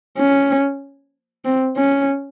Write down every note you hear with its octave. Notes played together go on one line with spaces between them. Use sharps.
C#4
C4
C#4